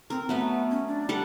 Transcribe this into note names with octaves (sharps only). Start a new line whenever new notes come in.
C4 A#4
F#3 A3 B3 B4
C#4
D4
G3 A4 F#5